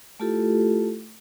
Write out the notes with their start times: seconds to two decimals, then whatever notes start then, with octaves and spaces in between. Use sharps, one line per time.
0.20 A3 E4 F4 G4 A4